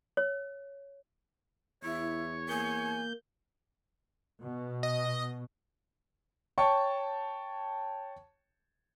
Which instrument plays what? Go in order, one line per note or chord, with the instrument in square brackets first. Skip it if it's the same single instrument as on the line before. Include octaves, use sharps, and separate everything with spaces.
[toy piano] C#5
[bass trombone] E2 [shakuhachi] E4 [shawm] C#5
[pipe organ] A#3 G6 [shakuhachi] G#5
[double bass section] B2
[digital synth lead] D#5
[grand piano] C#5 G5 A5 C#6